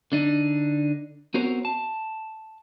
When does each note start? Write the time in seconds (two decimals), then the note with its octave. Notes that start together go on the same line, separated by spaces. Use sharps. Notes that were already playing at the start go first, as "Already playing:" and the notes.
0.12 D3 D4 D#4
1.34 B3 C4 F#4 A#4 C5 C#5
1.65 A5